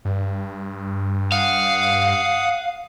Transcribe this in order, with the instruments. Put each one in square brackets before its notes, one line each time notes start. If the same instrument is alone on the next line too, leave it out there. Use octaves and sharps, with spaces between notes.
[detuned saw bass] G2
[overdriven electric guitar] F5 [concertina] F#5 D#6